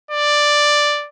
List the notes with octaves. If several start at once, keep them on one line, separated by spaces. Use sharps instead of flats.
D5